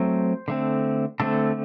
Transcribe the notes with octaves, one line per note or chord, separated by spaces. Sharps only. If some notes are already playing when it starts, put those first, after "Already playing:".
Already playing: F#3 A3 C4 C5
D3 A3 C4
D3 A3 C4 A4